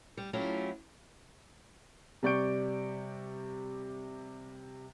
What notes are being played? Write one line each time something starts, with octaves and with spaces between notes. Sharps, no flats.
G3
F#3 A3 C#4 E4 F4 G4
C3 G3 D5 C#6 G6 D7